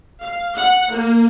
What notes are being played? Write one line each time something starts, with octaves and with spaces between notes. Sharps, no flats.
F5
F#5
A#3